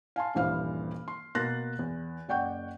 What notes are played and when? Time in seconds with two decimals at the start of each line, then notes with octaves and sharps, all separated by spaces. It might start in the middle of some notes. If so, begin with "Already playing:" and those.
0.16 F5 G#5 A5 C6
0.35 D#1 G2 E3 C5 F5 F6
1.08 C6
1.35 B2 A#3 C6 F#6 A6 A#6
1.79 E2
2.28 F#1 D5 F#5 G5 C#6 G6